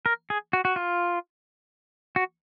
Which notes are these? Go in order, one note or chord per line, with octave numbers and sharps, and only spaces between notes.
A#4
G#4
F#4
F#4
F4
F#4